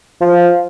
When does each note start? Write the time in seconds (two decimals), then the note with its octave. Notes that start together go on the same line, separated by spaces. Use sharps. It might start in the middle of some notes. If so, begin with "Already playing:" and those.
0.21 F3